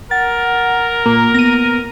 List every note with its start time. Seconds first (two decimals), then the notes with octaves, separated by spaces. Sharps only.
0.11 A#4 F#5 A6
1.06 A#2 A#3
1.34 B3 A#6 D#7